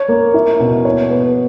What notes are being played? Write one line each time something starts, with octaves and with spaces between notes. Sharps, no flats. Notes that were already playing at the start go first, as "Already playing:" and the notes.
Already playing: C#5
A#3
E4
B2
C#5
B3